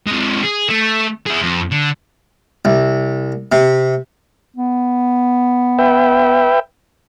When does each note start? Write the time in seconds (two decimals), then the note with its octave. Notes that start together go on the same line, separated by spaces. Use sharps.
0.07 C3 G#3
0.43 G#4
0.69 A3
1.26 E4 G#4
1.41 F2
1.71 D3
2.65 C2
3.52 C3
4.56 B3
5.79 B4 E5 G5